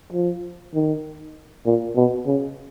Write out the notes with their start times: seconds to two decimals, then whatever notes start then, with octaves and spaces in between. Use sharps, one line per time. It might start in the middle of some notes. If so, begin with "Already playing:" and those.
0.13 F3
0.74 D#3
1.66 A#2
1.96 B2
2.26 C#3